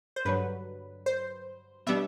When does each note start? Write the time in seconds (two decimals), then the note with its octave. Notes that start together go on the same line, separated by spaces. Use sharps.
0.16 C5
0.25 G2 D3 F#3 B4
1.06 C5
1.87 B2 G3 B3 D4 E5